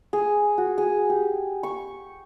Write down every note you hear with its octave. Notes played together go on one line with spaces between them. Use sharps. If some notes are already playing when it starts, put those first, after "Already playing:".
G#4
F#4
G#4
G4
C#6